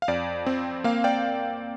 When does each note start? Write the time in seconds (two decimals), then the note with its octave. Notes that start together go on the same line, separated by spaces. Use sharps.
0.02 F5
0.08 F2 D5
0.46 C4
0.84 A#3 F5
1.04 D5 G5